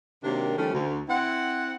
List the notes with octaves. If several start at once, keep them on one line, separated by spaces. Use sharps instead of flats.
C3 D#3 F#3 A#3 D4
D#3 F3 G3 A3 C#4
D2
C4 E4 C5 F#5